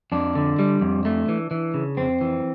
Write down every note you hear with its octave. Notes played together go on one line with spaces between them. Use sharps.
F2 D4
D3
G3
F2
A3
E3
E3
C#3
F2 C4
E3